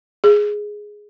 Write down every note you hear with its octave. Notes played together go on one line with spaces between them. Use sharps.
G#4